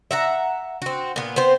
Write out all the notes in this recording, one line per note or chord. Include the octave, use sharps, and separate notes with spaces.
E5 F#5 A#5
C4 F#4
A#2 B3
B3 C4 C5